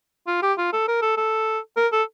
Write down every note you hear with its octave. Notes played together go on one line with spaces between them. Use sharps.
F4
G4
F4
A4
A#4
A4
A4
A#4
A4